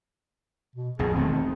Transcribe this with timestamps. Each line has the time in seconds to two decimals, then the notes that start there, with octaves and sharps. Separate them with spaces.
0.75 B2
0.99 A#1 F2 B2 G#4
1.14 E1 D#3 A3 C4